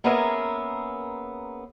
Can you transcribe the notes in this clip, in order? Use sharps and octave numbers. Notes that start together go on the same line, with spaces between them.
A#3 B3 C#4 G#4 A#4 E5